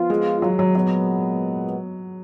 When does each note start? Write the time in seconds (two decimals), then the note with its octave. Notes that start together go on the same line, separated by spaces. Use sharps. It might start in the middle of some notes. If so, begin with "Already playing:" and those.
Already playing: F3 B3 F4
0.10 G#3
0.42 F#3
0.59 F#3
0.75 A#2 F#3 G#3 B3